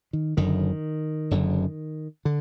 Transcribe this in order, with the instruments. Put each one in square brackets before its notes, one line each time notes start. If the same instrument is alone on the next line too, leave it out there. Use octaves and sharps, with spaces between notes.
[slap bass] D#3
F#1 F#2 D3 D#3
F#1 F#2 D3
D3